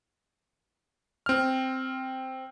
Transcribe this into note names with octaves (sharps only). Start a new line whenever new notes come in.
C4 F6